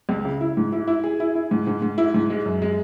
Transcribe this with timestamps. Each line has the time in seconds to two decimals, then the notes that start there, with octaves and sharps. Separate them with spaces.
0.09 C#2
0.25 C#3
0.41 E4
0.57 G#2
0.72 E4
0.87 E4
1.04 G#4
1.20 E4
1.35 E4
1.51 G#2
1.67 G#2
1.82 G#2
1.98 E4
2.14 G#2
2.30 G#3
2.46 F#2
2.62 G#3